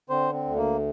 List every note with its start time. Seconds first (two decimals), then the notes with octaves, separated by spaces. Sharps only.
0.10 D3 C4 C5
0.33 C4
0.45 D2
0.56 A#3